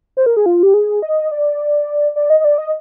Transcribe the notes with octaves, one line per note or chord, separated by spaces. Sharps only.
C5
A#4
G#4
F4
G4
G#4
D#5
D5
D5
D#5
D#5
D5
D#5